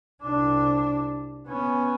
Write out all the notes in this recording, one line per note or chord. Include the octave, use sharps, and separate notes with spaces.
C2 D4
B3 C#4